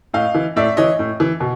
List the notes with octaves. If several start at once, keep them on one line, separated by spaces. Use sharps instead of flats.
A2 D#5 F5
E3
A2 D5 E5
E3 C#5 D#5
A2
E3
B2